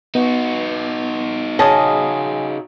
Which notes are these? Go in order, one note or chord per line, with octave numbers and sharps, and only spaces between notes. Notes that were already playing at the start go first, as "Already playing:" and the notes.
B3 D#4 F#4
C#3 G#4 D#5 A5